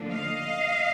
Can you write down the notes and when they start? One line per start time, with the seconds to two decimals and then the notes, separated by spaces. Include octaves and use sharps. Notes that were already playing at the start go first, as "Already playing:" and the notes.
Already playing: D2 D3 F3 A#3 D4
0.11 D#5 F5